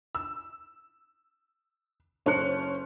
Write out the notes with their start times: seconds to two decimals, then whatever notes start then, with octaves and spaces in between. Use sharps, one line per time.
0.15 E6
2.26 F#1 C#4 A4 C5 F#6 C#7